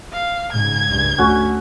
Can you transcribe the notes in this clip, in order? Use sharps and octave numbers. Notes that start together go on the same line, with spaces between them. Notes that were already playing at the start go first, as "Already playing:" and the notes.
F5
G#2 C#3 G#6
C#2 G2
D2 A3 C#4 F#4